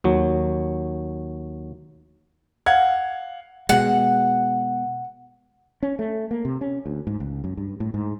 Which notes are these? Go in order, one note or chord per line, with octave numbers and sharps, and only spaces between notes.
D#2 F#3
F5 F#5 G#6
B2 G#3 F#5
C#4
A3
A#3
C3
C#4
D2
G#2
C#2
F#2
G2
A2
G#2